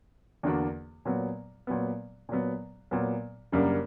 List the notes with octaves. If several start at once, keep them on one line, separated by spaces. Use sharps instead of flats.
E2 D3 A#3 D4 F#4
A#2 F#3 B3
A#2 F#3 B3
A#2 F#3 B3
A#2 F#3 B3
F#2 C#3 G3 A#3 D4